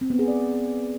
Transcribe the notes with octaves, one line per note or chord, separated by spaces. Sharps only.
C4
B3
G#4
D5